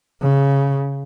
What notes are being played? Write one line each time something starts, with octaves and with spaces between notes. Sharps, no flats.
C#3